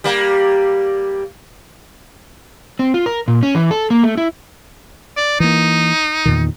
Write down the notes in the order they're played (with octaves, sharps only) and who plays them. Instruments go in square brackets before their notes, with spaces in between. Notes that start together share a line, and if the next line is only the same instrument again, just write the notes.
[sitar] G3 A#3
[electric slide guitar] C4
F4
A#4
A#2
C#4
E3
A4
A#3
A3
E4
[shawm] D5
[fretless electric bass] E3 A#3 [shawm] D#4
[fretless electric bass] E2 A#2 D#3